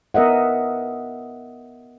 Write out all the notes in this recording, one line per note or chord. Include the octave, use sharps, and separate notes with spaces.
B3 A#4 D#5 E5 F#5